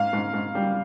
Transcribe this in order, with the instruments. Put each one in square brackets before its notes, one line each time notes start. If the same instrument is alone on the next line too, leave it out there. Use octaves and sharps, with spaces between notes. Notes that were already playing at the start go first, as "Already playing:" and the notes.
Already playing: [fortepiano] G#2 [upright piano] F5
[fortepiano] G#2
G#2
G3